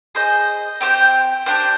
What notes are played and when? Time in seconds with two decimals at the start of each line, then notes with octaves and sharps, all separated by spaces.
0.15 G#4 C5 D#5
0.81 C4 G4 C5 G5
1.46 D4 G4 C5